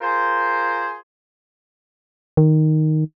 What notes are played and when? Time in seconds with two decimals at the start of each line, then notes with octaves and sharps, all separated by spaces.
0.01 F4 G#4 A#4 C5
2.37 D#3